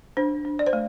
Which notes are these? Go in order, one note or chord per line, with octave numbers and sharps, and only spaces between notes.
D4 C5
D4
D5
C5
A3